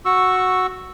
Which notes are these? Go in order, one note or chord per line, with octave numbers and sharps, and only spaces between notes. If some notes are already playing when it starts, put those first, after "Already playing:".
F#4 C#6 E6